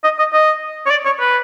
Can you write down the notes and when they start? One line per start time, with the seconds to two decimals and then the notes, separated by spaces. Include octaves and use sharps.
0.04 D#5
0.19 D#5
0.33 D#5
0.86 C#5
0.91 D5
1.05 C#5
1.20 B4